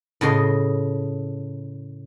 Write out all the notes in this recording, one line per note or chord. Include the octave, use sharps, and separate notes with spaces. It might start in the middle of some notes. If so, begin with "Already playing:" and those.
A2 C#3 D#5 C6